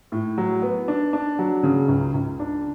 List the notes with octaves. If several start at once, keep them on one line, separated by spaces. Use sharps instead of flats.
A2
F#3
B3
D4
D4
F#3
C#3
C#2
C#2
D4